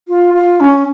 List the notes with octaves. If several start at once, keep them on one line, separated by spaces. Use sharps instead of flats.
F4
F4
C#4